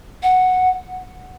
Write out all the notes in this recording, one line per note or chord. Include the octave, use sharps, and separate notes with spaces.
F#5